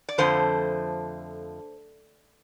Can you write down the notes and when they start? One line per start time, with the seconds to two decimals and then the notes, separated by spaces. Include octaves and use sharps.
0.09 D5
0.18 F2 D3 F3 A3 C5